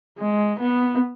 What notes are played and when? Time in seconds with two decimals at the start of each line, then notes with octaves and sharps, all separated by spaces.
0.19 G#3
0.59 B3